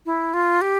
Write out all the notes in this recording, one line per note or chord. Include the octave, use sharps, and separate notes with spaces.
E4
F4
G4